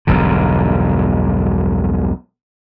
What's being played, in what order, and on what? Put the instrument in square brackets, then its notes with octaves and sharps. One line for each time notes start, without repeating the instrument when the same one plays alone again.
[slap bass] E1 B1 G2 D3